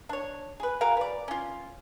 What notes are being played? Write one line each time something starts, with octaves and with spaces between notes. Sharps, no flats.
D4 C#5
G#4 B4
F#4 G#4 A#4 F5
B4 D5
C#4 F4